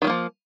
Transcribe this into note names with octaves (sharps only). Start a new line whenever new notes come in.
D#3 F3 G3 A#3